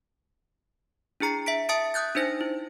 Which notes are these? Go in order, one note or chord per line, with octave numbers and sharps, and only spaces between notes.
D4 E4 G#4 A#5 C7
E5 B6 D7
E5 A5 D#6 A6 C#7 D7
D#6 F#6 G6 A6
D4 D#4 C5 A#6
E4